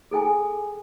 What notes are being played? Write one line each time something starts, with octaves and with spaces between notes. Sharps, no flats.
G#4 A4 G5 G#5